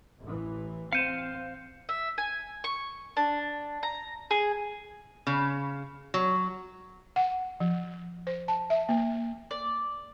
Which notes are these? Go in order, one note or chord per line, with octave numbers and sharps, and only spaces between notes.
A1 E3
C4 F5 G6 C#7 D#7 E7
E5
G#5
C#6
D4
A#5
G#4
C#3
F#3
F#5
F3
C5
A5
E5
A#3
D5